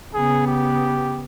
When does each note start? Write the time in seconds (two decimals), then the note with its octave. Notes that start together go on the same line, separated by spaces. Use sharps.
0.14 C#3 B3 G#4
0.47 G4